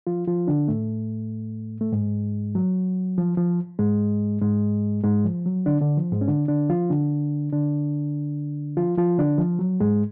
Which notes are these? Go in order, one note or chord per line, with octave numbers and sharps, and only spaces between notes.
F3 F4
F3 F4
D3 D4
A2 A3
A3
G#2 G#3
F#3
F3
F3
G#2 G#3
G#2 G#3
G#2 G#3
F3
F#3
D3 D4
D3 D4
F3
G#2 G#3
C#4
D3 D4
D3 D4
F3 F4
D3 D4
D3 D4
F3 F4
F3 F4
D3 D4
F3
F#3
G#2 G#3